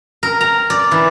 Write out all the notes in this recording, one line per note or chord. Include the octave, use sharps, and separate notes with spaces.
A#4
A#5
D5
E3